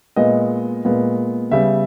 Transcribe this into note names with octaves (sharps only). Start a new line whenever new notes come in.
A#2 G#3 B3 D#5
A#2 G#3 B3
C#3 G3 B3 E5